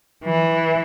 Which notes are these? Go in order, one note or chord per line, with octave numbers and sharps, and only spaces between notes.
E3